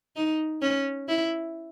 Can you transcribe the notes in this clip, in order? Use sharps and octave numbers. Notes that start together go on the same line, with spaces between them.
D#4
C#4
E4